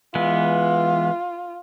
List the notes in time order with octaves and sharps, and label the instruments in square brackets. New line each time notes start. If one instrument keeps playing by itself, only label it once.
[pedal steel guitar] E3 G#3 B3 [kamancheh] F4